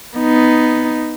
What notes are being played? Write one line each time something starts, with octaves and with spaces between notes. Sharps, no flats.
B3 D#4